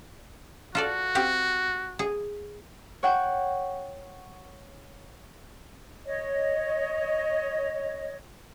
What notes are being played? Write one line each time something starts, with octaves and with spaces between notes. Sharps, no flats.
F4 F#4 A4 D5
C4 G4 F5
G#4
C#5 F#5 G5
C#5 D#5